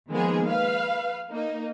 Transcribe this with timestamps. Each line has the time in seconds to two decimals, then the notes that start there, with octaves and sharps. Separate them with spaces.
0.11 D#3 F3 G#3 A#3 B3 G#4
0.47 B4 F5
1.32 A#3 D#4